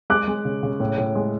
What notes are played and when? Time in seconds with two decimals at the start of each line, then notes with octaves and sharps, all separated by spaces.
0.10 G#3 D6 F#6
0.28 G#3
0.45 C#3
0.63 C#3
0.80 A2
0.98 A2
1.15 G#3